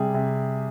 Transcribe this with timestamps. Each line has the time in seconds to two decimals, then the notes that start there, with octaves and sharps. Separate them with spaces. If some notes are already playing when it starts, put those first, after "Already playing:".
Already playing: C3 G3 G#4
0.14 C3